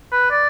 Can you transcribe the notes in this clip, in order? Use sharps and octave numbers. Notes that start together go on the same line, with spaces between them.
B4
D5